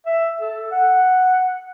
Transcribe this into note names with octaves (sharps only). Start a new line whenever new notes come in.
E5
A4
F#5